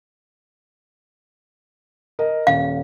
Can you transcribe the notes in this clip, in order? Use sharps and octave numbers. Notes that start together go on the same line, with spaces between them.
A#4 D#5
D#1 F5